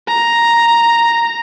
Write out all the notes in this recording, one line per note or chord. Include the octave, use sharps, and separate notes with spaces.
A#5